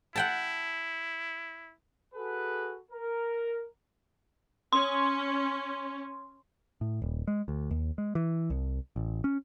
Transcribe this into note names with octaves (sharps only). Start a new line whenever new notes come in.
E4 F#5 G5 A5
F#4 G#4 A4 B4
A#4
C#4 C6
A2
D#1
G#3
D2
D#2
G#3
E3
C2
A1
C#4